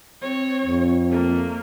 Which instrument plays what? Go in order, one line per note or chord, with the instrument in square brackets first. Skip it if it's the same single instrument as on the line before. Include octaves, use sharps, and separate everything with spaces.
[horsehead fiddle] C4 C#5
[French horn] F2
[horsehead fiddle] A3 A#3